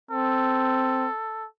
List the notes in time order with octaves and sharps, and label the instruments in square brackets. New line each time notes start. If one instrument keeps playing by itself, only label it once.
[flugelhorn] C4 [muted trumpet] A4